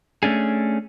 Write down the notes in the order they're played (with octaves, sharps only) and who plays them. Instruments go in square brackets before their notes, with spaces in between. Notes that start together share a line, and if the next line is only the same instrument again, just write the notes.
[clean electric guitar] A3 C#4 D4 G#4